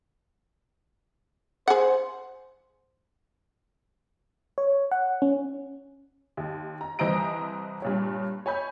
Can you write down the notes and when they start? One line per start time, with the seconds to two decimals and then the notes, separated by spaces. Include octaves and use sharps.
1.68 G#4 C5 F#5
4.58 C#5
4.91 F#5
5.22 C#4
6.37 D#2
6.81 A#5
6.99 C2 E3 C5 D#5 A#5 D7
7.82 G2 A#2 C#5
8.46 C#5 G#5 B5 G6